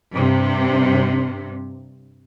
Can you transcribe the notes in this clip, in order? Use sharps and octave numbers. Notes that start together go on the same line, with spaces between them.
G2 C3